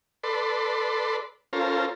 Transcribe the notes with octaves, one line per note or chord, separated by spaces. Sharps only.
A4 B4 D5 C6
C#4 F4 A4 A#4 C5